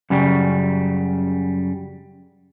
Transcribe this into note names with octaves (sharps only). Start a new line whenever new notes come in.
F#2 C#3 G3